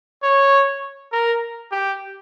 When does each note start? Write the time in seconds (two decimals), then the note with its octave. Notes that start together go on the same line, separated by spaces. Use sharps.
0.23 C#5
1.12 A#4
1.72 G4